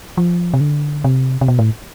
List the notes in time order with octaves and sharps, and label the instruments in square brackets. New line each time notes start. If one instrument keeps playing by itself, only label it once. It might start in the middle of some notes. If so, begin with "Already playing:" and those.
[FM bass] F3
C3
D3
C3
C3
B2
A2